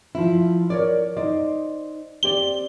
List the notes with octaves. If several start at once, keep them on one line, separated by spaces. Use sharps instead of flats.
F3 E4
A#4 C#5 D5
D#4 C5 D5
C4 G4 D5 G7